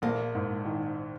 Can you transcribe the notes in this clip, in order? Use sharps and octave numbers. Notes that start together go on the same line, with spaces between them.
A#1 A#3
G#2
D#3